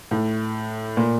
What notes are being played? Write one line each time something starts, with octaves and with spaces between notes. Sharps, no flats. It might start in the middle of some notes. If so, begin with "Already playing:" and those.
A2
A#2